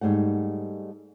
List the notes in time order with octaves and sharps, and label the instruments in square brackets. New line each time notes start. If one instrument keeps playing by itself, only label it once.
[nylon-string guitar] G#2 G3 A3 F#5